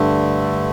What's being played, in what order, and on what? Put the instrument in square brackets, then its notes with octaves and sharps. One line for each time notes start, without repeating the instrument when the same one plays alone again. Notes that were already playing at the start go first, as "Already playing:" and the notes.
Already playing: [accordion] G2 D3 A3